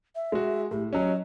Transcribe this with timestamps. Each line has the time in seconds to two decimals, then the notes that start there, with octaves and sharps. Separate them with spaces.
0.15 E5
0.32 G#3 F#4
0.71 A2 G4
0.93 F#3 C#4 D#5